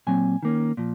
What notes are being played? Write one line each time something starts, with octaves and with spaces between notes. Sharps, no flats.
A#2 F#3 C4 G#5
D#3 A#3 C#4
A#2 F3